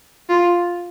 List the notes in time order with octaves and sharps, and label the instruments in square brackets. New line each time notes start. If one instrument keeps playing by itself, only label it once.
[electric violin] F4